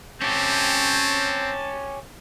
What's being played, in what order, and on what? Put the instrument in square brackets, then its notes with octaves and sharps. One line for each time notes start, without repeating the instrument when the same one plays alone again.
[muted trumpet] C4 [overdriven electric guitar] C#4 G4 [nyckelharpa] A5